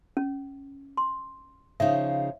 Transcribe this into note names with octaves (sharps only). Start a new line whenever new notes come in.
C#4
C6
C#3 F3 D#4 E5